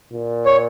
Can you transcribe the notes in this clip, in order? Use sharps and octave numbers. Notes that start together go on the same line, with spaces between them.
A#2
C#5